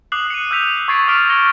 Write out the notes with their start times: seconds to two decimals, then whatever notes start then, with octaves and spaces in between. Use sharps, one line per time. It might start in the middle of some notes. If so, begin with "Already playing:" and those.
0.12 D6 D#6 F#6 C7 F#7
0.30 C#7 D#7
0.50 E6 F#6 G6 B6 F7
0.88 C#6 G#6 A6 C7 D7
1.08 D6 F6 B6 D7
1.29 A6 A#6 C#7 G7